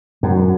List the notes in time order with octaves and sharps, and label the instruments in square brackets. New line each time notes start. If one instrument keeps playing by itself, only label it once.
[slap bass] F#2